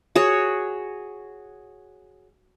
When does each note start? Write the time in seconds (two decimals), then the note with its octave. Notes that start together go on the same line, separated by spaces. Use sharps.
0.16 F#4 G#4 C#5